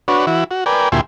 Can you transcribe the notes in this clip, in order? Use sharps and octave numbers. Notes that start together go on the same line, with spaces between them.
D4 F#4 B4 C#5
E3 E4 F#4
F#4
A#4 B4 D5 G5 G#5
D2 A#2 E4 G4 G#5 C6